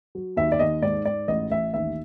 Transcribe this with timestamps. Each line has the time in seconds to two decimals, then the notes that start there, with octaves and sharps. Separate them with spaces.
0.15 F#3
0.36 D#2 E5
0.52 D5
0.59 D#2 D#5
0.82 G#2 D5
1.05 G#2 D5
1.28 A1 D#5
1.50 A1 E5
1.74 D#2 E5